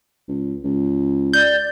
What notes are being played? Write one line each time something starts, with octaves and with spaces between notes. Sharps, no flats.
C#2
C#2
D5 G6